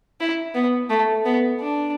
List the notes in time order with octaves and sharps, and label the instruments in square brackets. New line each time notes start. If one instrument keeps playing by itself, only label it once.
[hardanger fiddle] E4
B3
A3
B3
D4